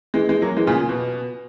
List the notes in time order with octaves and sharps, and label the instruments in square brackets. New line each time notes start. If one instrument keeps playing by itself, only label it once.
[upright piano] E3 G#3
E3 G#3
F#3 A#3
E3 G#3
A#2 C#3
A#2
B2